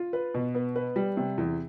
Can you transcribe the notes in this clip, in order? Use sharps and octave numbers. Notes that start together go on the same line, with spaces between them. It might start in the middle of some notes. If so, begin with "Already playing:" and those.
Already playing: F4
B4
B2
B3
B4
G3
C3
E2